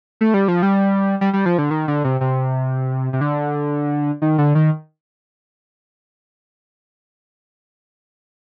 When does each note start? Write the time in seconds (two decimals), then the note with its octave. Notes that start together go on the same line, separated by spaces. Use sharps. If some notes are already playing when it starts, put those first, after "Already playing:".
0.21 A3
0.34 G3
0.48 F3
0.63 G3
1.21 G3
1.33 G3
1.46 F3
1.58 D3
1.71 D#3
1.88 D3
2.04 C3
2.21 C3
3.13 C3
3.21 D3
4.22 D#3
4.38 D3
4.55 D#3